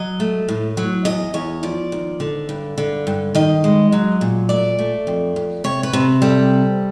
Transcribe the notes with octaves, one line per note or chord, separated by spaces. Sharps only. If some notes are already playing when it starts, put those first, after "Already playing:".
Already playing: F#3 D#5
A3
A2
F#3
E2 D#5
E2 C#5
F3 D5
D#2
D3
G2
D3
G2
D#3 D#5
G#3
F#3
A#2
A3 D5
A3
F2
F2
C3 C#5
B4
C3
G3 A4